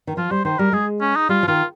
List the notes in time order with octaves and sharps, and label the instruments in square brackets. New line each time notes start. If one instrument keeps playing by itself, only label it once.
[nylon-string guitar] D#3
[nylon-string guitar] F3 [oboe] F4
[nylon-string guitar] G3 [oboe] C5
[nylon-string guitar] D#3 [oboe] C5
[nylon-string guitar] G3 [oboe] A#4
[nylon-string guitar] G#3 [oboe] G#4
[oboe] C#4
D#4
[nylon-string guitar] G3 [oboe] F4
[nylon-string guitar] F3
[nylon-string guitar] D#3 [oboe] F4